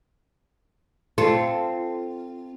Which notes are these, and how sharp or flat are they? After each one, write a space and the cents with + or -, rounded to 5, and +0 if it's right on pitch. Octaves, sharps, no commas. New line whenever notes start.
C4 -5 F4 -20 A4 -5